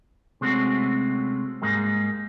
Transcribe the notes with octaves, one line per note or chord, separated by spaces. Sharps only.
C3 G#3 A3 C4 C#4 F#4
G#2 G3 G#3 A#3